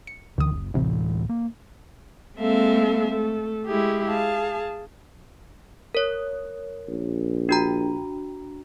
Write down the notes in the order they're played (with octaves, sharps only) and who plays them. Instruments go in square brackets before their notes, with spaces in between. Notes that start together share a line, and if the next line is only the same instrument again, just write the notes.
[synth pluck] C#7
[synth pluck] D2 D#6 [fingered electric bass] D3 E3
[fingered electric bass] F#1
[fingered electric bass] D1 A2 E3 [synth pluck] A1 C3
[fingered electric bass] A#3
[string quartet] G#3 A#3 C4 A4 E5 F5
A3 A4
G#3 E4 G4 G#4
G#4 F5 A5
[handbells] A#4 C#5
[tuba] A#1
[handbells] D4 F#4 A#5